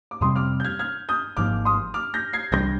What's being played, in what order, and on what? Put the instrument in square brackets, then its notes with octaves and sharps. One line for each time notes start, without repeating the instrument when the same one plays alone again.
[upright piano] D6
[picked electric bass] F2 C3 G3 C4 [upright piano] C6 D#6
[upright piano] D6 F6
G6
F6 G#6
F6 G#6
D#6 G6
[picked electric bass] G#1 G#2 F3 A#3 [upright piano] D6 F6
[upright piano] C6 D#6
D6 F6
G6 A#6
G#6 C7
[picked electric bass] C2 C3 G3 D4 [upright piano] G6 A#6